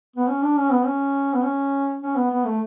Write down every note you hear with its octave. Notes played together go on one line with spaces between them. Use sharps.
B3
C#4
D4
C#4
B3
C#4
B3
C#4
C#4
B3
B3
A3